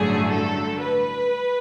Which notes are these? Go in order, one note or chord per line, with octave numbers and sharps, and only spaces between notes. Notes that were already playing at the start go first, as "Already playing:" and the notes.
Already playing: A1 G2 D3 F#3 A3 G#4
A4
B4